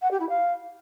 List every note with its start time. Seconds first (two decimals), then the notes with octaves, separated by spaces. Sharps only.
0.01 F#5
0.11 G4
0.20 E4
0.29 F5